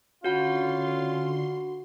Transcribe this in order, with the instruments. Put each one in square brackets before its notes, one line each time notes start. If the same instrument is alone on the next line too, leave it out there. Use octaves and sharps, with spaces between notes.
[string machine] D3 C6 [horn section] C#4 F4 [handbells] F#4 F#5 B5